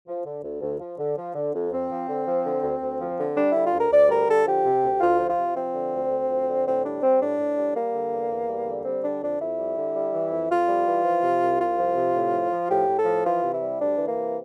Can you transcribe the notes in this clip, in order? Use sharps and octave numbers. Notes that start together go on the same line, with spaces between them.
F3
D3
D2
D2
F3
D3
F3
D3
F2
F2 C4
F3
D3
F3
D3
D2
D2
F3
D3
G3 D4
D3 E4
F4
D2
A#4
D2 D5
G3 A#4
D3 A4
F3 G4
C3
D2
D2 F4
F3
F4
C3
F3 C4
D3
D2
D2
F3
D3
A2 C4
G3 D4
G3 C4
A2 D4
A2
G3
G3 A#3
D3
E2
E2
G3
D3
G3 C4
D3 D4
F2 D4
F2 E4
G3
D3
G3
E3
F2
F2 F4
G3
E3
F3
C3
C2
C2 F4
F3
C3
A2
F3
F3
A2 G4
A2
A4
F3
E3 F4
C3
E4
G3
D2 D4
E3
A#3
C3